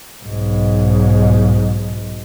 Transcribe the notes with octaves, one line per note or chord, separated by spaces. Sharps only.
B1 G#2